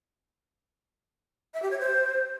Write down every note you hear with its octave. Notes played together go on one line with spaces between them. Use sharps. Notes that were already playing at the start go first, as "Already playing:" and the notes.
E5
G4
C#5
C5